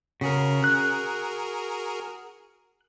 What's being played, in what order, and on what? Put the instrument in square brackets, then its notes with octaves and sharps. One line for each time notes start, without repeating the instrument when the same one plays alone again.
[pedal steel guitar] C#3 [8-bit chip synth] F#4 G#4 A#4
[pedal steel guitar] F#6